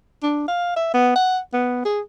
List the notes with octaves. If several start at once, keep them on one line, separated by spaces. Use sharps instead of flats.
D4
F5
E5
B3
F#5
B3
G#4